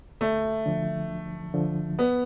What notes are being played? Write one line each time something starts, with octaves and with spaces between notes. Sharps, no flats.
D2 A3
D3 F3
D2
D3 F3
F2 B3